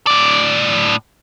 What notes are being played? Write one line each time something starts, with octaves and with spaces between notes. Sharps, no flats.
A2 D5